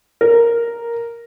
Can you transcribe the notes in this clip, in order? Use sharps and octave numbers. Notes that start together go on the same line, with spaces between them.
A#4